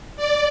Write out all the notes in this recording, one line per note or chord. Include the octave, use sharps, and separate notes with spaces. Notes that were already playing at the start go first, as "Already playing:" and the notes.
D5